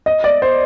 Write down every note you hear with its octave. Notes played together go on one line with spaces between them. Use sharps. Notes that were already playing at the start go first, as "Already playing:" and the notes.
D#5
D5
C5